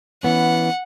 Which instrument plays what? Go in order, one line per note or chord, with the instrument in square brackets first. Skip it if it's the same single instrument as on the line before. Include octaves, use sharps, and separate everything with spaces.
[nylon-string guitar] E3 B3 C#4 [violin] F#5